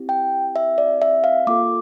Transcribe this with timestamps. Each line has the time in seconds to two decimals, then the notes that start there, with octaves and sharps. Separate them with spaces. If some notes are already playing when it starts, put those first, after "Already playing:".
Already playing: C4 E4 G4
0.09 G5
0.56 E5
0.78 D5
1.02 E5
1.24 F5
1.47 A#3 F4 A4 D6